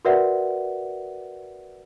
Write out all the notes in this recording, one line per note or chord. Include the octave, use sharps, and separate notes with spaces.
F#4 A#4 B4 D5 E5 F#5